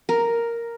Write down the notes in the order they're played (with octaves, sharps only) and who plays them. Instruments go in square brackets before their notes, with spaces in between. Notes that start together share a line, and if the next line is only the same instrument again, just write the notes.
[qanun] A#4